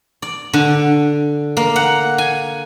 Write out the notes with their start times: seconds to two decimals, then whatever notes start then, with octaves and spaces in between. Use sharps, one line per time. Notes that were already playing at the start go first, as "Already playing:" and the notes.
0.22 D5
0.53 D3
1.57 A#3
1.76 F#5
2.18 G#5